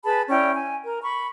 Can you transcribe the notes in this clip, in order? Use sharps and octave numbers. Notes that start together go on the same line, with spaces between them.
G#4 B4 A5 B5
C#4 E4 D5 G5
G#5
A#4
B5 C#6